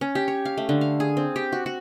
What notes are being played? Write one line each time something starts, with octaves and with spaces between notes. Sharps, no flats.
C#4
G4
C#5
F5
A3
D3
F5
G#4
C4
G4
F#4
F#4